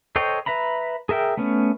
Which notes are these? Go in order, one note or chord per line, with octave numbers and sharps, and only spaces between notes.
A4 C5 C#5 D#5 G5
B4 E5 A#5 B5
G#4 A#4 E5 G5
A3 B3 C#4